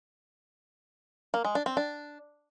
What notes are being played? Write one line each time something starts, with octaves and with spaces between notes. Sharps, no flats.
A#3
G#3
D4
C4
D4